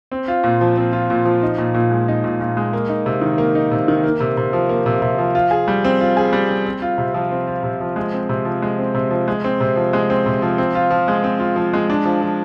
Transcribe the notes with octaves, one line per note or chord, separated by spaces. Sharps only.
C4
F4
A#2
F3
C4
F4
A#2
F3
D#4
A#2
A#2
G#3
D#4
A#2
A#2
G#3
A#3
D#4
C3
D#3
A#3
D#4
C3
D#3
A#3
C3
C3
F3
A#3
C3
C3
F3
F4
G#4
G3
C4
F4
G#4
G3
C4
C4
F4
C3
F3
C4
F4
C3
F3
G#3
C4
C3
F3
G#3
C4
C3
F3
G#3
C4
C3
F3
G#3
C4
C3
F3
C4
F4
F3
G#3
C4
F4
F3
G#3
D4
F3
F3